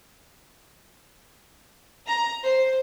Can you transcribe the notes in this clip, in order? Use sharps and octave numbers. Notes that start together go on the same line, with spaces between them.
A#5
C5